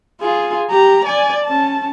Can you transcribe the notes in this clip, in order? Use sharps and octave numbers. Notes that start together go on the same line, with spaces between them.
F4 G#4
G4 A#5
D5 G#5
C#4 A5